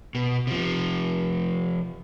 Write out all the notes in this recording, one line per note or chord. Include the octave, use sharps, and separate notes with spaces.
B2
C3 F3